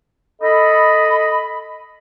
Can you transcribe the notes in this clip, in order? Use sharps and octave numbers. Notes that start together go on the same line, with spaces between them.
A4 D#5 B5